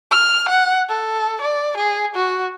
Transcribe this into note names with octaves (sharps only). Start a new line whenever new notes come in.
F6
F#5
A4
D5
G#4
F#4